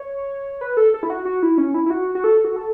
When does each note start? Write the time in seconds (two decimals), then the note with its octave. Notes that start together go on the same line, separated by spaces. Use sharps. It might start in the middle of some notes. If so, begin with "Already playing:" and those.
Already playing: C#5
0.61 B4
0.77 A4
0.94 A4
1.03 E4
1.10 F#4
1.25 F#4
1.43 E4
1.58 C#4
1.74 E4
1.86 E4
1.90 F#4
2.15 F#4
2.24 A4
2.45 F#4
2.56 A4